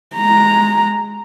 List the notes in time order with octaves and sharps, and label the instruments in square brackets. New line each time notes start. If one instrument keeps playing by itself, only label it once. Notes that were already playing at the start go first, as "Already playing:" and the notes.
[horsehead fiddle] G#3 A#5